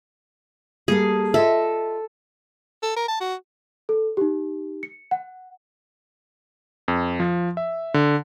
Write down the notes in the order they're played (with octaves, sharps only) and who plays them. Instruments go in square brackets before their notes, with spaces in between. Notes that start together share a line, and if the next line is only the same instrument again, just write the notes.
[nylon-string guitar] G3 A#3 A4 [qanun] G#4
[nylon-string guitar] F4 D#5 E5 [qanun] A4
[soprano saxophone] A4
A#4
A5
F#4
[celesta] A4
D#4 G4
C#7
F#5
[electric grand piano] F2
F3
E5
D3